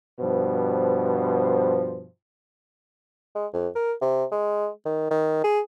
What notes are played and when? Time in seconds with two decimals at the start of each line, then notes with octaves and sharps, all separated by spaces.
0.20 G2 B2 F3 C5
3.35 G#3
3.54 F2
3.75 A#4
4.01 C3
4.32 G#3
4.85 D#3
5.11 D#3
5.44 G#4